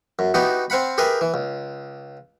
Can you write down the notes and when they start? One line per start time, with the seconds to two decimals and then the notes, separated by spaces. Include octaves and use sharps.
0.19 F#2
0.34 B3 D#4 E4 F#4 G4
0.70 C4 C5 F5 F#5 B5
0.98 G4 G#4 A#4 B4 E5 G5
1.21 E3
1.34 C#2